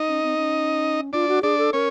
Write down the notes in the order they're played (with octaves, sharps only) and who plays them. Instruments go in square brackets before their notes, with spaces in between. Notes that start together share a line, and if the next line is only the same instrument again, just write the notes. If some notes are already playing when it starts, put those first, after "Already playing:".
Already playing: [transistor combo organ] D#4 D#5
[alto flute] C#4
C4
C#4
[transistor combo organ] D4 D5 [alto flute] F4
[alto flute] F#4
[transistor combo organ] D4 D5 [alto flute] G#4
[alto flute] A4
[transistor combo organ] C#4 C#5 [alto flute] A#4